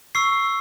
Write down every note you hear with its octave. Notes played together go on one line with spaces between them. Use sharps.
C#6 E6 C7